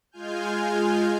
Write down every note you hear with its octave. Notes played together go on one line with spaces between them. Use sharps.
G#3 F4 G#5 F6 G6